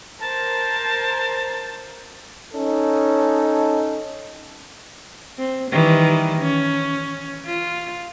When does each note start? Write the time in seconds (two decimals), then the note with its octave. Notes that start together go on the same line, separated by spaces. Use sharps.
0.20 A#4 C5 A5
2.54 C#4 D#4 A4
5.38 C4
5.71 D#3 E3 G3
6.39 C#4
7.46 F4